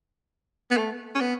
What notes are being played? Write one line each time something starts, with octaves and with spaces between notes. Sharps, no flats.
B3
A3
C#4
B3